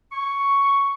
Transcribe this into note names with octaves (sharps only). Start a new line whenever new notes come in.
C#6